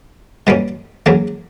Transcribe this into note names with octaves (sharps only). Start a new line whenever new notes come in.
B2 G3 A#3 C#4
E2 C#3 F#3 A#3